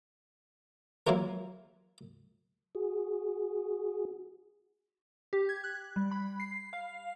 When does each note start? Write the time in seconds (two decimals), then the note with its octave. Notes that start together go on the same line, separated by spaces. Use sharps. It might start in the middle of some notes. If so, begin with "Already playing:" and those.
1.07 F#3 A#3 E4 F4 A#4
2.75 F#4 G#4
5.33 G4
5.49 G#6
5.64 F#6
5.96 G3
6.11 B5
6.40 C7
6.73 F5